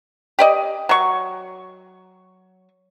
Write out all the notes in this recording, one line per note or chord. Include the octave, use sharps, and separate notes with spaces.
G4 D5 D#5
F#3 C#6